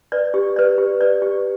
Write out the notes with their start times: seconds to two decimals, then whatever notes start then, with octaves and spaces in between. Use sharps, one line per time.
0.12 B4 D5
0.34 G4
0.56 B4 D5
0.78 G4
1.01 B4 D5
1.22 G4